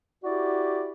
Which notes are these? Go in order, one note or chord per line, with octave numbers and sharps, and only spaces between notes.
E4 F#4 G4 D5